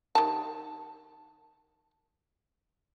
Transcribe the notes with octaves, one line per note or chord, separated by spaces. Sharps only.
D#3 G4 A5